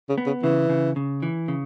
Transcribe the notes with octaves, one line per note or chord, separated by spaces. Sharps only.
C#3
B3
C#3
C#3 E3
C#3
C#3
E3
C#3